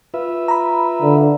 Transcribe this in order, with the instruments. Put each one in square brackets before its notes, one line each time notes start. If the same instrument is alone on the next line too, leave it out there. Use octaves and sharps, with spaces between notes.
[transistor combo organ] F4 B4 E5
[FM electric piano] A#5 B5
[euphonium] D3